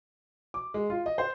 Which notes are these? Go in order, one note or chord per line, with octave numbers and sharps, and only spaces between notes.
D6
G#3
F4
D#5
C5